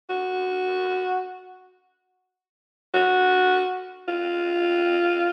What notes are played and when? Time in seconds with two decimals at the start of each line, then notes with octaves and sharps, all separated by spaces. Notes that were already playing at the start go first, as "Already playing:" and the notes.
0.09 F#4
2.94 F#4
4.08 F4